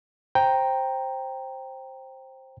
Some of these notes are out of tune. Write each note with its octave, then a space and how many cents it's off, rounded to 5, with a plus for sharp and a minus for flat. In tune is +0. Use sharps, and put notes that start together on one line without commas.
C5 +10 G5 +0 A#5 +0